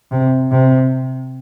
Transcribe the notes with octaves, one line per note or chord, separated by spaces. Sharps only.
C3
C3